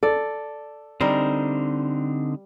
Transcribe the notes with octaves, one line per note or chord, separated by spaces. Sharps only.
A4 D5
D3 G3 C4 D#4 A#4